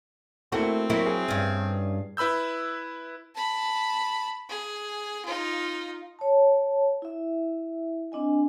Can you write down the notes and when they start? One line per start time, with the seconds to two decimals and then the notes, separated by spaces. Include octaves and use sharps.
0.52 A3 A#3 C4 E4 F#4
0.90 F#3 A#3 E4
1.06 G#4
1.28 G2 C#4
2.17 E4 B4 B5 E6 G6
3.35 A5 B5
4.49 G#4
5.25 D#4 F4
6.19 C#5 A5
7.02 E4 E5
8.12 C4 D4 D#5 G#5